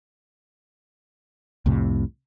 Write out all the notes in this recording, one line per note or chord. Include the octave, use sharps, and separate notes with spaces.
C2 F2 A2 C3